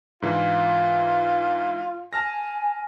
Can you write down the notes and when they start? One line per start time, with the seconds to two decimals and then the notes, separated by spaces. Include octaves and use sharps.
0.22 G#2 E3 D4 F4
2.13 G#5 A5 F6 A#6